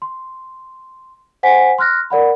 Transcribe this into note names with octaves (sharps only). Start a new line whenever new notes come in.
C6
C5 F#5 G#5 B6
C6 F6 F#6 A#6
A#4 D5 F#5 B5